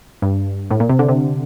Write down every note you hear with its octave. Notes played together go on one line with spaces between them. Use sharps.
G2
A2
A#2
C3
D3
C3